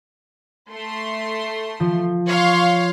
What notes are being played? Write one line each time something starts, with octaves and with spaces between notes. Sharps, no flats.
A3 C6
F3
C#5 F5 C6